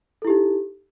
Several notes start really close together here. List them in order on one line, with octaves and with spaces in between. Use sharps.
A4 E4 G4 D#4